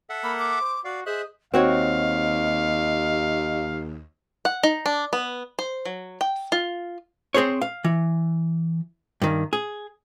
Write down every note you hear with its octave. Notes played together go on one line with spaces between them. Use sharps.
A4 E5 F#5
A#3 B5
D6
C5
F#4 D5 F5
G#4 C5 D#5 E5 F#6
D#2 C4 F#4 C#5 D#5 F5
F#5
D#4
D4
B3
C5
F#3
G5
F4
C4 G#4 C5 C#5
F5
E3
G2 D#3
G#4